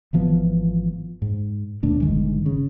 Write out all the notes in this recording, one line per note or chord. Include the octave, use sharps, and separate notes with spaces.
G#1 E3 F3 B3
G#2
D#2 B2 A3 D4
G1 D#3 G#3
C#3